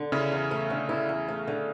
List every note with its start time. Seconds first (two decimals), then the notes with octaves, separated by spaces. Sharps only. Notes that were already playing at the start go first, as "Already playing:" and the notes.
Already playing: D3
0.12 C#3 C#4 E4
0.32 E2
0.51 A3
0.70 D3
0.89 E4
1.09 E2
1.28 A3
1.47 D3